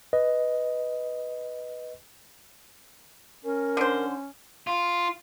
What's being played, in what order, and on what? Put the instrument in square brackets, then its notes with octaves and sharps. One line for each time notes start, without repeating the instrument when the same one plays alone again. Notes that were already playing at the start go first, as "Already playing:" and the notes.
[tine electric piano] B4 D#5
[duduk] C#4 [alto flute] A#4
[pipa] D3 C5
[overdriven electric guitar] F4